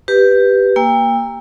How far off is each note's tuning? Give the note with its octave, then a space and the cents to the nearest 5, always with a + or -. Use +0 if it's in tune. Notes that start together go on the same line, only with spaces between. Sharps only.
G4 +0 B4 +0
A#3 +0 G5 +35 E6 +0